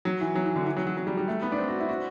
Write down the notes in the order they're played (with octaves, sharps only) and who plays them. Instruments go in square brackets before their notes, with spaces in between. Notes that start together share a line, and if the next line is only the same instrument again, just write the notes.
[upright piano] F#3
E3
F#3
E3
D3
E3
F#3
F#3
F#3
G3
G3
A3
B3
D4
C4
F#4
E4
F#4